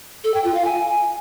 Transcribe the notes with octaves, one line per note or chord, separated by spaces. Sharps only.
A4
G5
F4
F5
G#5